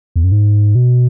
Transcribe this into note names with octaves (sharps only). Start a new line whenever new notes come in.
E2
F#2
G#2
B2